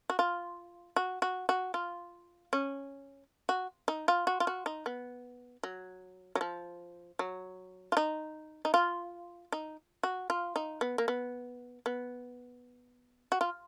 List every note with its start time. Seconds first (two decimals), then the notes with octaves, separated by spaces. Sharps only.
0.10 F#4
0.19 F4
0.96 F#4
1.22 F#4
1.49 F#4
1.74 F4
2.53 C#4
3.49 F#4
3.88 D#4
4.08 F4
4.27 F#4
4.40 F4
4.47 F#4
4.66 D#4
4.86 B3
5.63 F#3
6.35 F#3
6.41 F3
7.19 F#3
7.92 F4
7.97 D#4
8.65 D#4
8.74 F4
9.52 D#4
10.03 F#4
10.30 F4
10.56 D#4
10.81 B3
10.98 A#3
11.08 B3
11.86 B3
13.32 F#4
13.41 F4